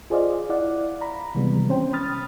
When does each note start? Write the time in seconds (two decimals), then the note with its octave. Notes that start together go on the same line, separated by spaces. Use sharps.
0.10 F4 G#4 C5 D5 D#5 F5
0.49 E4 D5 F5 F#5
1.01 A#5 B5
1.35 C3 D#3 E3 G3 G#3 B3
1.68 C4 C#4 C5 G5
1.93 B5 D#6 F6 A6